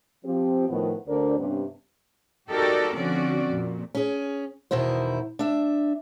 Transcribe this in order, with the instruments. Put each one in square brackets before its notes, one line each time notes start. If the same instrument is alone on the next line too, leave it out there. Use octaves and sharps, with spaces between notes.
[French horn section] F3 C4 G4
A2 D#3 F3 B3
D2 D3 D4 A#4 C5 D5
G2 C3 G3 B3 C#4 D4
[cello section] D#4 F#4 G4 A4 A#4 D5
D3 F3 C4 C#4 F#4 D5
F2 A#2
[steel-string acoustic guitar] C#4 G#4
E2 B2 D#3 E4 C5
D4 E5